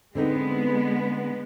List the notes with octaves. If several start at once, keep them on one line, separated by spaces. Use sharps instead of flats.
D3 G#3 B3 C4 D#4